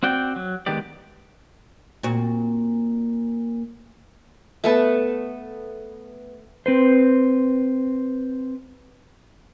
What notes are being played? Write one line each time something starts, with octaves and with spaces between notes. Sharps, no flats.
C4 F#4 D5 G5
F#3
D#3 G#3 B3 G4 D5
A#2 C4 F#4
A3 B3 A5
C4 B4 C5